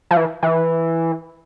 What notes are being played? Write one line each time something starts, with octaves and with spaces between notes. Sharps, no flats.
F3
E3
E3